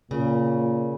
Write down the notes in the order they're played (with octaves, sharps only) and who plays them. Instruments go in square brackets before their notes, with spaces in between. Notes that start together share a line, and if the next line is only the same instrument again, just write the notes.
[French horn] A#2 [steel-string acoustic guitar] C#3